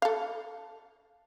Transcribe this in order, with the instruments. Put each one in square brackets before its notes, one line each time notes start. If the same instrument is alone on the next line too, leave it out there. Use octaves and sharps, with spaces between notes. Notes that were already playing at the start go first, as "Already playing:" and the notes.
[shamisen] A4 F5